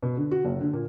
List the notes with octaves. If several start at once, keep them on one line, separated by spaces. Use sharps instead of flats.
B2
D3
F#4
F#1
D3
A#2